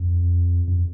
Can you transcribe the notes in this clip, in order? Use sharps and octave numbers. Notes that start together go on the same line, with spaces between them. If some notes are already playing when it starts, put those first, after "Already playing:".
Already playing: F2
F2